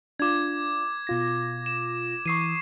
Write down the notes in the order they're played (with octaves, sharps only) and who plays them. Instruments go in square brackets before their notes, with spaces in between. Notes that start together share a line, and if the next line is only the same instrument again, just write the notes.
[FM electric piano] D4 F4 [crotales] D6 G#6
[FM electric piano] B2 F4 A#6
[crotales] E7
[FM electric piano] E3 D#6 [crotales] C#6 C7 D#7